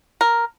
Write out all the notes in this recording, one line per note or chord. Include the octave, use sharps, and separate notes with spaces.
A#4